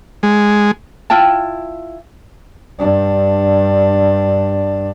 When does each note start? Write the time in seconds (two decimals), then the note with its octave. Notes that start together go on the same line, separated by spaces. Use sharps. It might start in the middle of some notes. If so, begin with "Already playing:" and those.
0.23 G#3
1.10 E4 F4 G5 A5
2.79 G2 D4